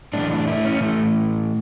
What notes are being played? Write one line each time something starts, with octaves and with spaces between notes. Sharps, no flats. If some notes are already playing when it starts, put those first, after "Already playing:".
A2 E3 D4
D4
E4
C#4
A3